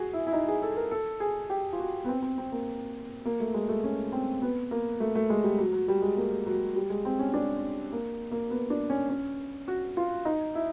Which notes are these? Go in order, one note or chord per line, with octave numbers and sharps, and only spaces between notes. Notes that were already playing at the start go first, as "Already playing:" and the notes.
Already playing: F#4 G#4
E4
E4
D#4
G#4
A4
A#4
A4
G#4
G4
F4
F#4
B3
C4
C4
C4
A#3
A#3
A3
G#3
A3
C#4
C4
B3
A#3
A3
A3
G#3
G3
F#3
F#3
G3
G#3
A#3
F#3
G3
G#3
C4
C#4
D4
A#3
A#3
B3
D4
C#4
C#4
F#4
F4
D#4
E4